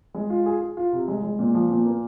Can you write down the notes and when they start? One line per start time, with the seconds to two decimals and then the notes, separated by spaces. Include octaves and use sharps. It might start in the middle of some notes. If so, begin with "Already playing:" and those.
0.14 G#3
0.30 F4
0.46 G#4
0.61 G#4
0.77 F4
0.92 C3
1.08 G#3
1.23 G#3
1.39 A#2
1.54 F3
1.70 A#2
1.86 A#3